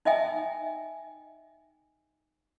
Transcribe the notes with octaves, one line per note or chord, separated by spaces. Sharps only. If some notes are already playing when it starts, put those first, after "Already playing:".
D#4 D#5 E5 G5 G#5